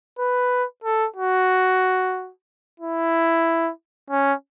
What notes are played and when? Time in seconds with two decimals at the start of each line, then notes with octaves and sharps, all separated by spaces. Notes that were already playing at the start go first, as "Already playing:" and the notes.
0.19 B4
0.84 A4
1.16 F#4
2.80 E4
4.10 C#4